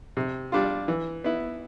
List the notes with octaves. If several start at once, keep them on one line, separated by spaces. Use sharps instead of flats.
C3
G3 D4 F4
E3
B3 E4